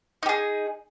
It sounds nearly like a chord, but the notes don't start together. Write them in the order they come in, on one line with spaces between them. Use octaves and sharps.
D#4 G4 G#4